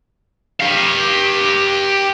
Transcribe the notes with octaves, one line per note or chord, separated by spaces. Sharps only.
G4 F5